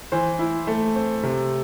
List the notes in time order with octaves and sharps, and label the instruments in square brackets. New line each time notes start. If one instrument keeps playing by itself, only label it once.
[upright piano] E3 C5
E4
A3
C4
C3